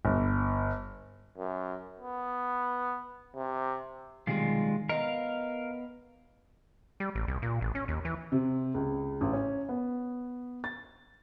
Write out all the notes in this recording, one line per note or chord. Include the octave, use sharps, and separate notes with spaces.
G1
F#2
B3
C3
B1 C3 D#3 G3 G#3 F4
B3 A#4 D#5 F5 A#5
G3
A1
C2
A#2
A1
C#4
D#2
E3
C3
C#2
A1
C#4
B3
A6